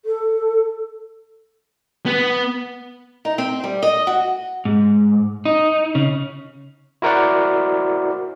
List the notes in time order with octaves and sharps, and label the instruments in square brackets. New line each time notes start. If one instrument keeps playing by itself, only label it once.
[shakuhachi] A4
[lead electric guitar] B3
[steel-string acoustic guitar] D#4
C4
G3
D#5
F#4
[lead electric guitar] G#2
D#4
C#3
[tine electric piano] E4 F#4 A#4 C5 D5 F#5